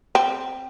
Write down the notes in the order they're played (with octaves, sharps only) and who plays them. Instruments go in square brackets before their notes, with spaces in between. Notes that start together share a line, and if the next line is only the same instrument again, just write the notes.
[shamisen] C4